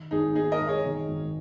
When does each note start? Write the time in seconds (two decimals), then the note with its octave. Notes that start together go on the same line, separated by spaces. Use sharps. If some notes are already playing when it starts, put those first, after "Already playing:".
Already playing: D#3
0.11 G#1 D#4 G#4
0.35 A#3 D#4 G#4
0.52 A#4 D#5
0.61 G#2
0.68 G#4 C#5
0.84 D#3
1.08 G#1